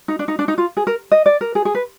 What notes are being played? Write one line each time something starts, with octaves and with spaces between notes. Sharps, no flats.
D#4
D4
D#4
D4
D#4
F4
G#4
A#4
D#5
D5
A#4
G#4
G#4
B4